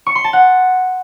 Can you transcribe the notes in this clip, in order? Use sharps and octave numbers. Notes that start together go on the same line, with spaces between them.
C#6
C6
A5
F#5